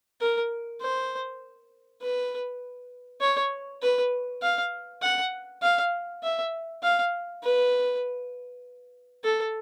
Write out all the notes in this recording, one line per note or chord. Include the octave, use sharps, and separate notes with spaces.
A#4
C5
B4
C#5
B4
F5
F#5
F5
E5
F5
B4
A4